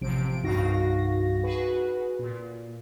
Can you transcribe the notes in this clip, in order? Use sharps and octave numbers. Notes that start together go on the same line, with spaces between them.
A1 C3 F3 D7
C2 G2 D#4 F#4 F5 A#6
F#4 G#4 B4
A#2